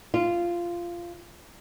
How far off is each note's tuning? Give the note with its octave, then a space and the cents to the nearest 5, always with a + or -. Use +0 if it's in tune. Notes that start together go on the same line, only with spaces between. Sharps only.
F4 -15